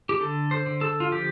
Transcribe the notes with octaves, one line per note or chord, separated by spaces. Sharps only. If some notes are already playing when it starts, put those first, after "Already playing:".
G4
D3 A4
C5
D3
A4
F4
F3 G4